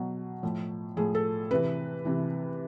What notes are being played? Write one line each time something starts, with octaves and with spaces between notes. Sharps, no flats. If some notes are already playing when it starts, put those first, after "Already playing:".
Already playing: B2 F#3
A2 F3
A2 F3 G#4
A4
C3 E3 B4
C3 E3